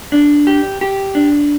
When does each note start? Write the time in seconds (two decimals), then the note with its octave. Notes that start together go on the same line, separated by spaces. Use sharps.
0.12 D4
0.47 G4
0.81 G4
1.15 D4